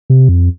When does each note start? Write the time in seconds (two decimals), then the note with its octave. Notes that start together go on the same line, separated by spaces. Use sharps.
0.10 C3
0.29 F2